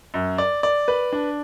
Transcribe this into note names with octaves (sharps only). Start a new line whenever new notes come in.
F#2
D5
D5
B4
D4